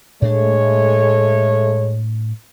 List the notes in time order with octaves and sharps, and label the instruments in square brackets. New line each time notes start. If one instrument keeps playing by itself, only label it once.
[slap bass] A2 D4 [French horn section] G#3 A3 C#5